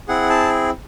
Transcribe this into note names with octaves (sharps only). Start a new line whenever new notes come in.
C4 E4 G#4 F#5
A5